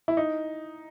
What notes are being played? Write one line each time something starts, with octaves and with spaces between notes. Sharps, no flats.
E4
D#4